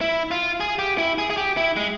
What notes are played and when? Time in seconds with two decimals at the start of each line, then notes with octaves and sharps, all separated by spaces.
0.01 E4
0.31 F4
0.60 G#4
0.79 G4
0.98 E4
1.18 G#4
1.30 G#4
1.37 G4
1.57 E4
1.76 G#3